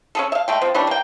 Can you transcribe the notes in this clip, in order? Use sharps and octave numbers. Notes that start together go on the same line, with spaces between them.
C#4 G#4 A4
E5 F5
G#3 A3 G5
F3 C4
E3 G3 C#4 D4
A#3 G5